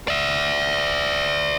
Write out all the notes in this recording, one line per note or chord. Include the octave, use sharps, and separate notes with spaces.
D5 E5